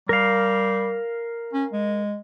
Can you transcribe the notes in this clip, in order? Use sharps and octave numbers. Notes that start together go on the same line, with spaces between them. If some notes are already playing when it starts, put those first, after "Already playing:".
G3 A#4 F5
C#4
G#3